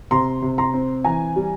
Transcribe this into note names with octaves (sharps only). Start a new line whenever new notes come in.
C3 A#5 C6
C3
A#5 C6
C4
E3 G#5 A#5
G3